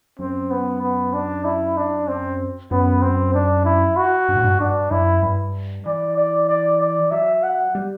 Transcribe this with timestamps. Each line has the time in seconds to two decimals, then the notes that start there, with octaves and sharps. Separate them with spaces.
0.19 F#2 C4
0.51 B3
0.82 B3
1.14 D4
1.45 E4
1.77 D4
2.08 C4
2.71 F#2 B3
3.02 C4
3.34 D4
3.65 E4
3.97 F#4
4.28 G2
4.36 A2
4.44 G2
4.60 G2 D4
4.91 F#2 E4
5.23 G2
5.86 E3 D5
6.17 D5
6.49 D5
6.81 D5
7.11 F#3 E5
7.43 F#5
7.75 G3